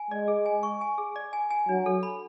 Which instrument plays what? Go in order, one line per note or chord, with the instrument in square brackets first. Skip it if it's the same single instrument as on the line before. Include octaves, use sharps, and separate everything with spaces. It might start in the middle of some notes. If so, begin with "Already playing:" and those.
Already playing: [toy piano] G#5
[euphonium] G#3 [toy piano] D5
[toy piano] G#4
G#5
C#6
G#5
G#4
D5
G#5
G#5
[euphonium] F#3 [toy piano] D4
[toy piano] A4
B5